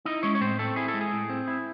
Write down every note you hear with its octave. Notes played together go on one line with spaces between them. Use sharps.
D#4 E4 D#5
G#3 C#4 C#5
C#5
A2 C4 C5
A3 C4 A4
E4 G#4
A4
G#3
G#4
A2
C4
E4